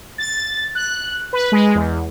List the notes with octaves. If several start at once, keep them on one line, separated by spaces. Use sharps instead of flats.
A6
F#6
B4
G#3
E2